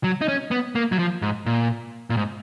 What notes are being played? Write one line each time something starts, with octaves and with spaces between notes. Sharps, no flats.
F#3
D#4
C#4
B3
A#3
F#3
F3
G#2
A#2
A#2
G#2